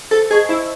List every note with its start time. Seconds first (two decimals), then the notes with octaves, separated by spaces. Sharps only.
0.11 A4 C5
0.31 G#4 D#5 A5 C#6
0.49 E4 C5